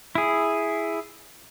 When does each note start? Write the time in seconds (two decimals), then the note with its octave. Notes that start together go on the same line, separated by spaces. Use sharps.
0.15 E4 G#4